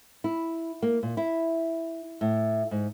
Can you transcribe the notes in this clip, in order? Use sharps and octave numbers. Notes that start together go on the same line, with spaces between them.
E4
A#3
A#2
E4
A2
G#2